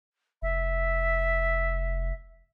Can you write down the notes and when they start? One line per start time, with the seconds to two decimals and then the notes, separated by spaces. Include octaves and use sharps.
0.42 F1 E5